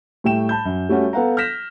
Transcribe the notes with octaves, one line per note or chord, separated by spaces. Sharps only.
A2 G3 A3 G5 E7
A5 B5 G6
F#2
G3 A3 C#4 F#4
B3 A4 F5 F#5 A#5
F6 G6 A#6 B6 E7